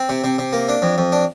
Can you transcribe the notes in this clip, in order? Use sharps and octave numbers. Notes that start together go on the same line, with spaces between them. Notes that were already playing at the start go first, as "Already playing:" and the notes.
Already playing: C4
C3
C3
C3
A#3
D4
F2
F2
D4